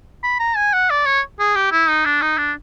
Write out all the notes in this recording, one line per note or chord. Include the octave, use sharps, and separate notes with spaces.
B5
A#5
G#5
F#5
D5
C#5
G#4
G4
E4
D#4
D4
D#4
D4